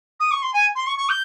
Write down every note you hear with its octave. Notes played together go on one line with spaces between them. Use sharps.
D#6
C#6
C6
G#5
C6
C#6
C#6
G6